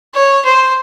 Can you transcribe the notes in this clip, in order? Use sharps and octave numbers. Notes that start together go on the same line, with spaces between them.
C#5
C5